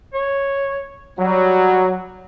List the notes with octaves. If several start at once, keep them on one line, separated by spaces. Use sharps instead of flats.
C#5
F#3 G3